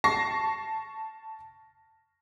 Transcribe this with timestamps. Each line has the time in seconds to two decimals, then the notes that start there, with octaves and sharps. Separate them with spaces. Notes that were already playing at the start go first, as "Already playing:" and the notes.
0.04 A5 C#6 A#6 C7